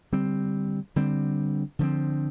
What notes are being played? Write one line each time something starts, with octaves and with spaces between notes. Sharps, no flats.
D3 G3 C4
D3 G3 C4
D3 F3 C4